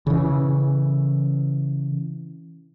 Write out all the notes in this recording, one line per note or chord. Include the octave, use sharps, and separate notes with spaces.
C#3 E3